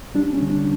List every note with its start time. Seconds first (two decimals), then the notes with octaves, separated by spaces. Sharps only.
0.15 G3 D4
0.33 C#4
0.42 D3
0.50 D4